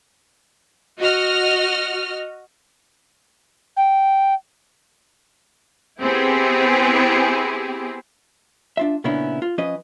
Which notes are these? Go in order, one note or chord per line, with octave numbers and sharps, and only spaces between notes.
F#4 D#5 F6
G5
B3 C4 E4 G4 G#4
D4 F4 E5
A#2 C#3 B3 C#4 D4 E4
F4
F3 C#4 B4 D#5